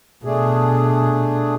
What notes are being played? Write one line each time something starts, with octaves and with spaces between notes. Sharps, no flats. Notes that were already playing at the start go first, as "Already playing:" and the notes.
B2 A3 D4 G#4